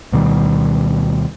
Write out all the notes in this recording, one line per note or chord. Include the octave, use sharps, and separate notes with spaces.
D2 B2 D#3 G3